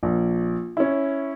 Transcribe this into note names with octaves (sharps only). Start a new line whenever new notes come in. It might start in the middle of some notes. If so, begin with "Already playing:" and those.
A#1
C#4 E4